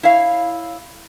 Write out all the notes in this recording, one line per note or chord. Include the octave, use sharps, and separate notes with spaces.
E4 C#5 F5